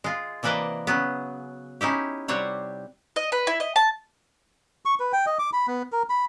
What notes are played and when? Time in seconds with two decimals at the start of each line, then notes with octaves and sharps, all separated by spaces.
0.04 G#3 F4
0.43 C3 E3 A#3 B4 D5 D#5
0.87 C#3 F#3 B3
1.81 C#4 D#4 E4 G4
2.28 C3 G3 C4 C#5 F#5
3.16 D#5
3.32 B4
3.47 E4
3.60 D#5
3.76 A5
4.85 C#6
5.00 B4
5.13 G5
5.26 D#5
5.39 D6
5.53 B5
5.67 B3
5.92 A#4
6.10 B5